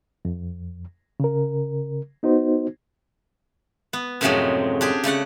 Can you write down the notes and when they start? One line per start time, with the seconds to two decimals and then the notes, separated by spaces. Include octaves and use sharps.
0.25 F2
1.20 C#3 A#4
2.23 B3 D#4 F#4 C5
3.93 B3
4.21 F#2 A2 C3 F3 F#3 G#3
4.81 D4 G4 G#4
5.04 C#3 A3 D5 F#5